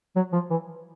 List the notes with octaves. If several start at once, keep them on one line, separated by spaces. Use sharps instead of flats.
F#3
F3
E3